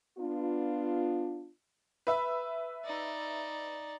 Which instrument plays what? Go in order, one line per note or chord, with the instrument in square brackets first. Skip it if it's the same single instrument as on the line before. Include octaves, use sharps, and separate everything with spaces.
[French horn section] B3 D4 F4
[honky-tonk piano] B4 E5
[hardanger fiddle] D#4 D5